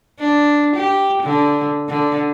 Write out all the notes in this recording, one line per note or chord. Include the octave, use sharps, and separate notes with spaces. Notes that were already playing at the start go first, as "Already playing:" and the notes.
D4
G4
D3
D3